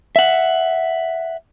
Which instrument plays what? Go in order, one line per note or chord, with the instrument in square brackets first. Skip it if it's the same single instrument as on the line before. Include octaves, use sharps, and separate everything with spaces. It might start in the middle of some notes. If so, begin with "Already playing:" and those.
[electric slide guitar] E5 F#5